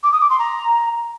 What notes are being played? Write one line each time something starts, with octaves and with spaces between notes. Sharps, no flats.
D6
D#6
D6
C6
A#5